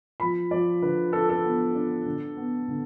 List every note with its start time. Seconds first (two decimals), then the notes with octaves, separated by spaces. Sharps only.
0.20 F3 B5
0.51 F3 D5
0.82 D3 B4
1.13 D4 A4
1.29 A4
1.44 B3
1.75 D4
2.06 D3
2.37 B3
2.68 D3